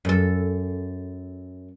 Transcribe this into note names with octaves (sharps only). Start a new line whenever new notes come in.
F#2 A4